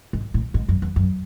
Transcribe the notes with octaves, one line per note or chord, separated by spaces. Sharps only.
G#2
A2
G#2
F#2
E2
F#2